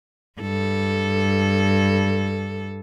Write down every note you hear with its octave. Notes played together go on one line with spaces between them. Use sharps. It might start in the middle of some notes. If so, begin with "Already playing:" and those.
G2 A4